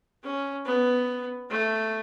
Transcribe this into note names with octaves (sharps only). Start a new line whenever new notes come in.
C#4
B3
A3